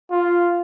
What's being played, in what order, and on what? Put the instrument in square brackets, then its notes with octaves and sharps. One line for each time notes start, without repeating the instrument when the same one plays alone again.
[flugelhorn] F4